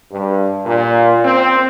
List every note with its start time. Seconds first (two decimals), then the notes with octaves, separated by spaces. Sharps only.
0.12 G2
0.66 A#2
1.25 C4